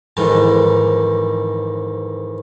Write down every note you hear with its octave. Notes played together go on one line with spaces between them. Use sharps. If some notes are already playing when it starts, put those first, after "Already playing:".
F2 G#2 D#3 E3